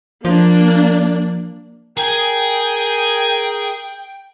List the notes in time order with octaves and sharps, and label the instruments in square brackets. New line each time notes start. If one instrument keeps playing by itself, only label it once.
[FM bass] F3 [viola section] A#3 D4
[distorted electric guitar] G#4 G#5 [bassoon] A#4 [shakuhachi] G5